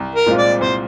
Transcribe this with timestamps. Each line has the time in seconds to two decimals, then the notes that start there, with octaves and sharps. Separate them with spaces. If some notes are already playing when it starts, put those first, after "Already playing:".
Already playing: C2
0.15 A#4
0.26 A#2 G#3 C4 F4
0.38 D5
0.61 C2 C5